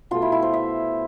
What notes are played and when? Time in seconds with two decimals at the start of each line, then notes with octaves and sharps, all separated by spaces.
0.11 B2 A3 F4
0.22 E4
0.32 E4
0.42 C5
0.53 E5